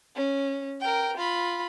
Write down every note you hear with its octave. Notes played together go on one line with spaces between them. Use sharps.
C#4
A#4 G5
F4 B5